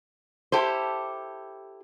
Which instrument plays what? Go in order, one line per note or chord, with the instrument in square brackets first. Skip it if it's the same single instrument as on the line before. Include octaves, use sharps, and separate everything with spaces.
[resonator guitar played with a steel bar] E4 G4 A4 C5